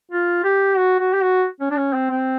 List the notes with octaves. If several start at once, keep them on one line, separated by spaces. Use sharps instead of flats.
F4
G4
F#4
F#4
G4
F#4
C#4
D4
C#4
C4
C4